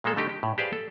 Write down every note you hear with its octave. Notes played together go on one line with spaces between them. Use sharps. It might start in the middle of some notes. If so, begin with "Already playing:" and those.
A#2 G#3 A#3 A4
D3 G3 A3 D#4 G4 D#5
G4
A2
G4 G#4 B4 C5 D5 F5
A4